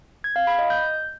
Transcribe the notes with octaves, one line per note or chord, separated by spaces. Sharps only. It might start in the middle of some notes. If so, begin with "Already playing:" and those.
G#6
F5
B5
D#5
G6